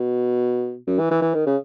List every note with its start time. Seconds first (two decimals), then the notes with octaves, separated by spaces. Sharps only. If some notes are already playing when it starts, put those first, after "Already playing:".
Already playing: B2
0.87 F#2
0.99 E3
1.11 E3
1.22 E3
1.34 D#3
1.46 C#3